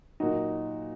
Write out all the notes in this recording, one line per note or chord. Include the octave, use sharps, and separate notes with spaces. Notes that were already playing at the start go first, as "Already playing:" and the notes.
A#2 F#3 D#4 F#4